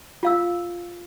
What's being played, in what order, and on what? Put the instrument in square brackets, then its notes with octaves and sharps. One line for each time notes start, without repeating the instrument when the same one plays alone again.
[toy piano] F4 F5 E6